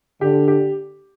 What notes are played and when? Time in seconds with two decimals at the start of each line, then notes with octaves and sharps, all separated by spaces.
0.21 D3 G4
0.48 G4